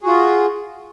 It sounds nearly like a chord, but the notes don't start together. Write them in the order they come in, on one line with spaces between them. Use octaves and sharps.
G#4 F#4 F4